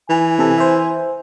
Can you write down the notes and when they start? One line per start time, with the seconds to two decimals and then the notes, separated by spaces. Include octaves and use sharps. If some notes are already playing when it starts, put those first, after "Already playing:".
0.10 E3 G#5
0.39 C3 A4
0.58 C5 E5